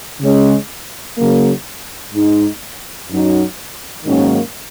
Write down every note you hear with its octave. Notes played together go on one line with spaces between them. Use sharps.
C#3 G#3 C#4
C#3 F#3 A#3
G#2 G#3 D#4
F#2 F#3 D#4
G#2 D#3 F#3 A#3 C#4